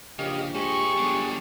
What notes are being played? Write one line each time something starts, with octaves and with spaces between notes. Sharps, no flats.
A#1 C#3 G4 D#5 F5
G#3 G4 G#4 C5 D#5 C#6
G1 F#3 D4